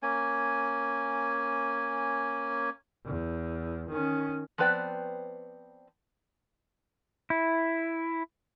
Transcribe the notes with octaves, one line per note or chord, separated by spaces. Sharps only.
A#3 C#4 G#5
E2
D#3 C#4
F3 B3 C4 B4 D5 G5
E4